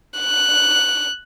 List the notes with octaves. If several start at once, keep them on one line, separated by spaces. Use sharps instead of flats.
F#6